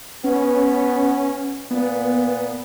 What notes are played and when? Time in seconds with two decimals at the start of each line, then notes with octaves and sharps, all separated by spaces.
0.24 B3 C#4
1.71 A#2 B3